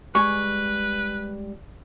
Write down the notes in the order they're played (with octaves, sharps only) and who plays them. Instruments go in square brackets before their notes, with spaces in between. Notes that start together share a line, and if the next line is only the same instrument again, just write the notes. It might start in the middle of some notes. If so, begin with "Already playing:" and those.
[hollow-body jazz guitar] G3 G#3 G#5 [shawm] B4 [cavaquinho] C#6